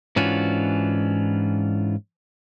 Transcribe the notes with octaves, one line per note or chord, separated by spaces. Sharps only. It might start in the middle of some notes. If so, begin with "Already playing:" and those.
G#2 E3 C#4 D4 F4 F#4